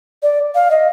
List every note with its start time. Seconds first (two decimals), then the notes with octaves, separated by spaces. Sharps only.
0.23 D5
0.55 F5
0.71 D#5